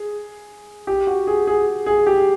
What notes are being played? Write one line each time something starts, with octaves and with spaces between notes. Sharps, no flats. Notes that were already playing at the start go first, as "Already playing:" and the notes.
Already playing: G#4
G4
F#4
G#4
G#4
G#4
G4